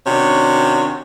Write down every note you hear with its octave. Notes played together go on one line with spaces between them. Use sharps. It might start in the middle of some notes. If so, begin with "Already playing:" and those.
C3 D#3 C#4 D4 F#4